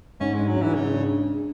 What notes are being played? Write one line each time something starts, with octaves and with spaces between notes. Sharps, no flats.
G#2 C#4
G#3 D4
F#3
G#2 E3
C#3 G#3
D4
D4